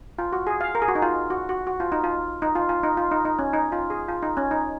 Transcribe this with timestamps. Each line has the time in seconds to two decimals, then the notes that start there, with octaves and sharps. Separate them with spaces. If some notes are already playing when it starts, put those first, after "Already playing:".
0.19 F4
0.32 F#4
0.47 G#4
0.61 F5
0.75 A#4
0.82 G#4
0.88 F#4
0.95 D#4
1.02 F4
1.30 F#4
1.49 F#4
1.67 F#4
1.80 F4
1.92 D#4
2.04 F4
2.42 D#4
2.55 F4
2.69 F4
2.83 D#4
2.97 F4
3.11 D#4
3.25 D#4
3.39 C#4
3.53 D#4
3.72 F4
3.90 G#4
4.08 F4
4.22 D#4
4.37 C#4
4.51 D#4